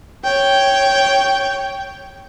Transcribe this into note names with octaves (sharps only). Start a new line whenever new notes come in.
C#5 G5